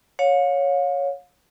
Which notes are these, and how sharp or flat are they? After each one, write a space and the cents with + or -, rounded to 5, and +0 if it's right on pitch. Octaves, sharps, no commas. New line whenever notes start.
C#5 +0 F5 +35